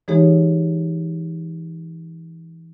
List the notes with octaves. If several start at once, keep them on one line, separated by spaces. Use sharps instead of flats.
E3 G#3 D#4 G4 G#4 C#5